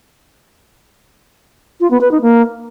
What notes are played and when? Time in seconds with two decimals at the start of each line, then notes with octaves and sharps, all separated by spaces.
1.80 F4
1.91 B3
2.01 B4
2.11 D#4
2.22 A#3